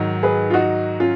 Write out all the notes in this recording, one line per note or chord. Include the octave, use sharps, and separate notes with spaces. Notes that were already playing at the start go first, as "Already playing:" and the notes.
Already playing: G#2 D#3 F#3
G#4 B4
F4
D#4 F#4
C#4 F4